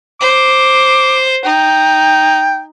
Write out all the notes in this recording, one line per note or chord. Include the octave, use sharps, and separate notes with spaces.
C5 D6
D#4 G5